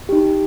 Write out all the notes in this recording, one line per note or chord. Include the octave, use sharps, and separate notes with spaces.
D#4 G4